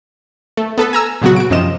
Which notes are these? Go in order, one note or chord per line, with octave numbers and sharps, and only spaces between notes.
A3
B3 A4 B4
G#5 A#5 E6
A#2 C#3 F#3 B3 F#4
F#4 D7
F#2 C3 F3 D#5 E7